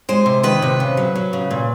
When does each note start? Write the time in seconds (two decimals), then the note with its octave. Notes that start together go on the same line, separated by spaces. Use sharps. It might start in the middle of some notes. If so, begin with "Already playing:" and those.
0.09 G#3 C5
0.26 C3
0.43 D#3 B4
0.62 C3
0.80 C#3
0.97 F#3
1.15 F#3
1.33 C#3
1.51 A#2